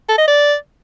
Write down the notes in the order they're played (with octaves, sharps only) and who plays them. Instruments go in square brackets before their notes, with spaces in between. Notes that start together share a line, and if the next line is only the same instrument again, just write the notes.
[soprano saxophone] A4
D#5
D5